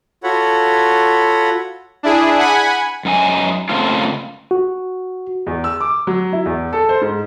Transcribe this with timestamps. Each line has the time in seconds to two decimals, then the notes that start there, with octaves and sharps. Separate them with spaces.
0.23 F4 F#4 A4 C#5 F#5 B5
2.03 D4 E4 G#4
2.38 F#5 G#5 B5
3.05 F#2 D#4 G#5
3.69 C#3 A3 A#3 C4 F4
4.51 F#4
5.47 E2
5.64 E6
5.80 D6
6.07 F#3
6.32 E4
6.46 E2
6.73 A4
6.89 C5
7.01 G#2